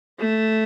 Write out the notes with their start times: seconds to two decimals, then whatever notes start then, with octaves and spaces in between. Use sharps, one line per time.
0.20 A3